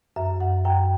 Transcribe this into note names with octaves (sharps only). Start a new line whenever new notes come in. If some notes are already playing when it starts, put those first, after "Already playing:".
F#2 E5
F#2 F#5
F#2 G5